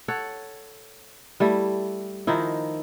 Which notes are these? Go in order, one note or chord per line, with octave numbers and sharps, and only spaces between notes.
A4 C#5 F#5
G3 A3 E4
D#3 F3 D#4 E4